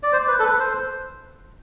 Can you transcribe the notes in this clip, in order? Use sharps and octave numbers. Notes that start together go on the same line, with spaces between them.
D5
C5
B4
A4
B4
C5